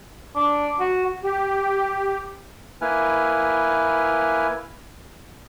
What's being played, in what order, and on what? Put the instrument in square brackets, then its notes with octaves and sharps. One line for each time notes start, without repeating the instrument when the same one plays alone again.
[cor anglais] D4
F#4
[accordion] G4
[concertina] A#3 E4 B4 G#5 F6